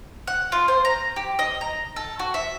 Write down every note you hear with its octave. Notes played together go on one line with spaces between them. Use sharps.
F#5
F4
C5
A#5
G4
D#5
A#5
A4
F#4
E5